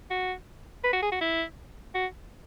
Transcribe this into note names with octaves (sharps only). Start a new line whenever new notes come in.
F#4
B4
F#4
G#4
F#4
E4
F#4